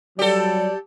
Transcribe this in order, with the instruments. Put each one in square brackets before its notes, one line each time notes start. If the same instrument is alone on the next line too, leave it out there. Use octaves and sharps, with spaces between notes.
[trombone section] F#3 G3 [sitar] G4 A4 [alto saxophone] D5